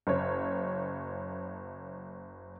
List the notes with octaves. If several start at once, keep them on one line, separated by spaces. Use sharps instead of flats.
F#1 C#5